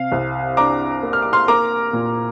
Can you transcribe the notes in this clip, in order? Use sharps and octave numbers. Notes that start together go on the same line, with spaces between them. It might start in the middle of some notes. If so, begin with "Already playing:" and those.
Already playing: C3 F5
C2
D4 A#5 D6
A#3
F6
D6
C6 F6
A#3 A#5 D6
A#2